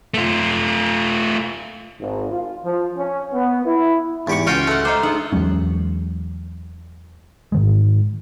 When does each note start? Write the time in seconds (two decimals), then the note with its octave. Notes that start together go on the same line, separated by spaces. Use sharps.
0.14 A3 F4
1.99 G#1
2.30 F4
2.64 F3
2.97 C#4
3.32 B3
3.65 E4
4.27 E2 G#2 G4 C#6
4.47 C#2 C#4 F4 F#4 G5
4.67 A3 F#5
4.85 F4 C5 D#5 A#5 D6
5.03 D4 D#4 G#4 F#5
5.33 E2 F#3 G#3 C#4
7.52 G#2 D#3 G#3